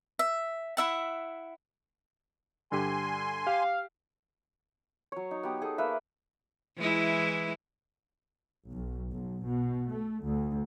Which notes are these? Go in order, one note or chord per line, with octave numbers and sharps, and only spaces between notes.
E5
E4 E5 F#5
G2 D3 G4 G#5 C6
G4 F5
F#3 C#5
D#4
B3 G4
B3 D#4 G#4 A4
A#3 B4 E5
E3 G#3 E4
B1
B1
B2
A3
D2